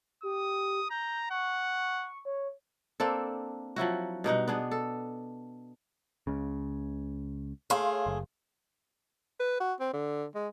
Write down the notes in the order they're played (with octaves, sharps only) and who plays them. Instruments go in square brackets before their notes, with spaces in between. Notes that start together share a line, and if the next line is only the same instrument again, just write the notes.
[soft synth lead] G4 [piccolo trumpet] D#6
[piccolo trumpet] A#5 [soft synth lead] G6
[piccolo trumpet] F#5 [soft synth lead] C#6
[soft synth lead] C#5
[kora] A#3 C4 D4 A4
F3 F#3 E4 F#4
G2 B2 D#4 F#5
B3 D4 G#4
A4
[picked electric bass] C#2 C#3
[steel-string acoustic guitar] A3 G#4 [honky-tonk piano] C#5 F5 C6
[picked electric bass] F#1
[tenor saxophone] B4
F#4
C4
D3
G#3